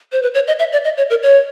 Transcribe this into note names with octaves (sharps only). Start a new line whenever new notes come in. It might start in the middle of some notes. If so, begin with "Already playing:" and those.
C5
B4
C#5
D#5
E5
D5
D#5
C#5
A#4
C#5